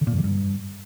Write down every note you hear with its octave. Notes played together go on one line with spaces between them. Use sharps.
D3
A#2
F#2
D#3
G2